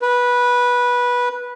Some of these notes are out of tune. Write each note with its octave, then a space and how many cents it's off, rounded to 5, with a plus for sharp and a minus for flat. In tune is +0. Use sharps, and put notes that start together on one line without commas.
B4 -15